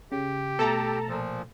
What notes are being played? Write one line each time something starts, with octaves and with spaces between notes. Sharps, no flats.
C#3 G4
B2 A3 A4 A5 A#5
A#2 F3